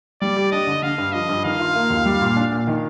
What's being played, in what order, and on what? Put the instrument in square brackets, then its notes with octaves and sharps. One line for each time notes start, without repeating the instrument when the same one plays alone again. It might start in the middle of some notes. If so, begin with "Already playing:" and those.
[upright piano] G3 [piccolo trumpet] D5
[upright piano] G4
[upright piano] D4 [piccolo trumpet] D#5
[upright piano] D3
[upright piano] D3 [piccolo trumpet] F5
[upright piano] G2
[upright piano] F3 [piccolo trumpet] D#5
[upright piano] G2
[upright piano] D#3 [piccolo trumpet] F5
[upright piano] F4
A#3
D#2
G3
A#2
D4
A#2
D#3